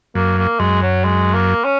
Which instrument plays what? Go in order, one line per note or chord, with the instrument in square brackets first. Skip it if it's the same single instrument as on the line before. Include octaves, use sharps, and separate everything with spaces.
[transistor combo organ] F#2 [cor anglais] A#3
[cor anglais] A#3
[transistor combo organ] F#2 [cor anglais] G#3
[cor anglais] F#3
G#3
A#3
C#4